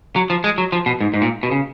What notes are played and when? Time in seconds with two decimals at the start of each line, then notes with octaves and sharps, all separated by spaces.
0.16 F#3
0.30 F3
0.44 G#3
0.58 F#3
0.72 F3
0.86 B2
1.01 G#2
1.14 G#2
1.22 A#2
1.43 B2
1.51 C#3